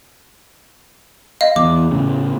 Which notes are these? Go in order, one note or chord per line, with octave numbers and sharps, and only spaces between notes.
D#5 F5
E2 D6
A2 C#3